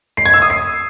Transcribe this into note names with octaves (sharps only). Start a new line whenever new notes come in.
C7
G#6
E6
D#6
C7